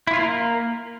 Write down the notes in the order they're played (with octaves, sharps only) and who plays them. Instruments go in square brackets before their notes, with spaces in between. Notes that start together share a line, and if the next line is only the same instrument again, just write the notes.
[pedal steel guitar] E4
F4
A#3